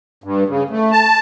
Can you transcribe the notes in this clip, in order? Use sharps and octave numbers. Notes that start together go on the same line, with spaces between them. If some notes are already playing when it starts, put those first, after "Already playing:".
G2
C#3
A3
A5